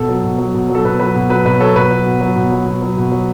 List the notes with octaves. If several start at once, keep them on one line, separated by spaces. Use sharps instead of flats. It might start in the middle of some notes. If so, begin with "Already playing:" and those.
Already playing: B2 A4
F#3
B2
F#3
B2
F#3
A4
B2 B4
F#3 B4
B2
F#3 B4
B2 B4
F#3 A4 C#5
B2 B4
F#3
B2
F#3
B2
F#3
B2
F#3
B2
F#3